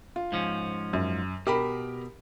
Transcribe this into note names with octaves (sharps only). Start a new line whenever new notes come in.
F4
G#2 F3 C#4
F#2
B2 G4 A#4 B5